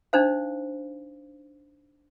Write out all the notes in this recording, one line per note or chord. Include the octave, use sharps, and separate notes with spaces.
D4 D#4 C5 F5